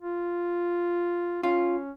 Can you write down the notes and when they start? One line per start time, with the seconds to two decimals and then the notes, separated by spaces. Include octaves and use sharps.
0.01 F4
1.43 C#4 F4